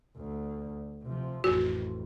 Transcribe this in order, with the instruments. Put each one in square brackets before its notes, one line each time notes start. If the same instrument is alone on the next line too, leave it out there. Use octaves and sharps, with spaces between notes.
[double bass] D2
C3 F3
[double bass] A1 F2 [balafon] F#4